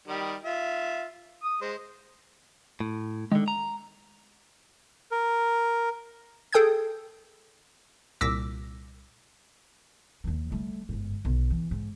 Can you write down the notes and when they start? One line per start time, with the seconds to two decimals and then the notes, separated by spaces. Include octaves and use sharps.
0.08 D#3 G3
0.45 F4 E5
1.43 D#6
1.61 G#3 C5
2.80 A2
3.31 D3 D#3 G#3
3.48 A#5
5.11 A#4
6.53 G#4 A4 G5 D#6 G6 G#6
8.21 C2 A#2 D6 E6 A#6 B6
10.24 D#2 D#3
10.50 G3 A3
10.89 G1 G#2
11.25 B1
11.50 E3
11.71 G#2